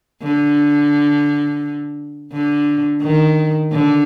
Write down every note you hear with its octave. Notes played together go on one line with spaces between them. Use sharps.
D3
D3
D#3
D3